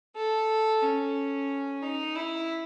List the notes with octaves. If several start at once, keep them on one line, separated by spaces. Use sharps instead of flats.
A4
C#4
D#4
E4